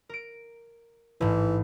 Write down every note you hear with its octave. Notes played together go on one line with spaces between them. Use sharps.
A#4 D7
A1 G#2 E3